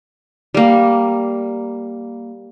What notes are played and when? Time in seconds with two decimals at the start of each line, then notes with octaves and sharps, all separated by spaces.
0.54 G3 A#3